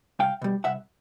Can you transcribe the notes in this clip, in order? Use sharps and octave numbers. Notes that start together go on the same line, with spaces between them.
C2 F5 G5
B2 G3
C2 E5 F#5